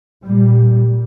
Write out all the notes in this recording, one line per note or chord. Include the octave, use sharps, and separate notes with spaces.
A#2 G3